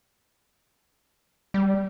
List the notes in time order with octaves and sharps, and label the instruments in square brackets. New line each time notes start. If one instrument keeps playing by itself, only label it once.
[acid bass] G3